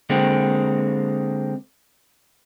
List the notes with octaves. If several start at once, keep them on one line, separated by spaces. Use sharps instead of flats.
D3 G#3 A#3 C4